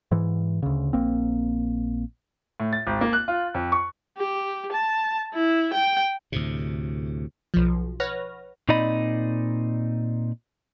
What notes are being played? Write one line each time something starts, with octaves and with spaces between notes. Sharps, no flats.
G#2 E3
D2 C#3
A#1 A#3 C4
A2
A6
G#1
A#3
F#6
F4
F2
C#6
G4
A5
E4
G5
D2 A2 C3
B1 F3
B4 C#5 F#5 F6 A#6
A#2 C4 D#4 D5 D#5 B5